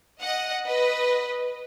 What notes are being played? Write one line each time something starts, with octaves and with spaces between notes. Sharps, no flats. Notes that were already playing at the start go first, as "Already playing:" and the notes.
D#5 F#5
B4 D#5